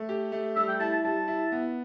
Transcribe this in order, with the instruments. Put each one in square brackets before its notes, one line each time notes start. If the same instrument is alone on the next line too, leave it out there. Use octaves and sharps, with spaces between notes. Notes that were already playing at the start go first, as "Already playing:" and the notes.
Already playing: [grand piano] A3
G4
A3
[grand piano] G3 [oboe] E5
[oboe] G5
[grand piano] E4 [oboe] A5
[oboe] A5
[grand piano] G3 [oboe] A5
[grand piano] E4
B3